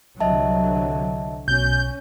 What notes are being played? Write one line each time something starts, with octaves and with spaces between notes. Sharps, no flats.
C2 D3 F#3 D#5 E5 A5
B1 B2 C#4 G6